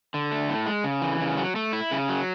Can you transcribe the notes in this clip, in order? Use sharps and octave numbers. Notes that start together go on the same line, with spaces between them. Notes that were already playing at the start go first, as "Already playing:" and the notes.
D3
A3
A2
G#3
C#3
E3
C#3
F#3
A3
E4
C#3
F#3